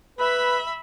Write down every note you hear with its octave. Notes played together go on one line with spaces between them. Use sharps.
B4 E5 B5